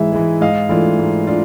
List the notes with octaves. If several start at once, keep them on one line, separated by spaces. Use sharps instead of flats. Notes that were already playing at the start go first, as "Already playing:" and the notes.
Already playing: G#2 E3 G#3 E5
E3 G#3
G#2 D#5 F5
E3 A3 D4 F4
G#2
D4 F4